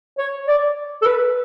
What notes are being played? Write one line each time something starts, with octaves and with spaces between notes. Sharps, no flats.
C#5
D5
A4
B4